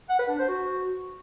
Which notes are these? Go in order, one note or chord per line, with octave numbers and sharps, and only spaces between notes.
F#5
B4
D4
C5
F#4